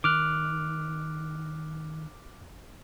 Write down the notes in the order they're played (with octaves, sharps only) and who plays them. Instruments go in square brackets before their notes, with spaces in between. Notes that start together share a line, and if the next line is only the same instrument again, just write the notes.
[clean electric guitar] D#3 [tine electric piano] D6 F6 F#6